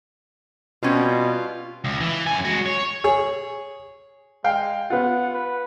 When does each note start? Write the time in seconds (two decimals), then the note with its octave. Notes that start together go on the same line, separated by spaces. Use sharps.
0.83 B2 G3 C4 C#4 F4
1.84 C#2
2.01 E3
2.27 F#2 G#5
2.45 G#3 F#4
2.66 C#5
3.04 G#4 C#5
4.44 G#3 F5 G5
4.90 B3 F4 F#5
5.34 B4